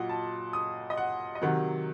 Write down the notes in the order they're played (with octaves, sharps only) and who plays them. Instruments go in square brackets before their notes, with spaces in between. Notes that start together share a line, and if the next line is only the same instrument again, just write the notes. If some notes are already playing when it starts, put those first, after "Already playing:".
Already playing: [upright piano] A#2 F#3 D#5 F#5
A5
D#6
D#5
F#5
D#5
C3 D#3 F#3 F#5